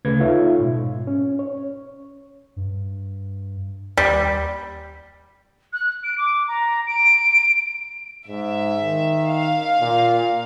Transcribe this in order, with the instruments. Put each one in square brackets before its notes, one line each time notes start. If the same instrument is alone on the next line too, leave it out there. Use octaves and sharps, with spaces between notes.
[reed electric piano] D2 C#3 A3 B4 G#6
D#4 F4 A4 C#5 E5 F5
G#2 B2
C#4
C#5
[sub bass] G2
[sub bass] D#2 [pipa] G3
[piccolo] F#6
D7
D6
A#5
D7
[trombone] G#2 [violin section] E5
[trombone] D#3
[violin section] F5
[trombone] A#2